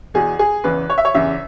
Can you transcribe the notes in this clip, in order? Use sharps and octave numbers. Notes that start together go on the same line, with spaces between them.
E2 B2 G#4
G#4
E2 C#3 E3 B4
C#5
E5
C#5
E2 C#3 E3 E5